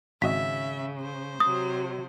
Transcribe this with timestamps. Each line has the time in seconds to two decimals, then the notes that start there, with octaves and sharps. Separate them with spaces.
0.22 G#1 C#3 F#4 D#5 E5 B6
1.01 C5
1.40 C3 F#3 D#6